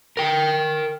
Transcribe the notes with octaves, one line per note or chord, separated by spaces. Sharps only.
A#4 G5